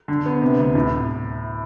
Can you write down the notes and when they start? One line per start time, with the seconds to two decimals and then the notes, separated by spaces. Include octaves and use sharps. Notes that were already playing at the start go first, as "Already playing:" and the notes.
0.08 D3
0.26 B3
0.42 C3
0.59 D2
0.75 A2